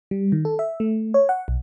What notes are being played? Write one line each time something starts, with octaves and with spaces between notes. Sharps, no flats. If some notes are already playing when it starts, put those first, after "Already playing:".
G3
D#3
A4
E5
A3
C#5
F#5
B1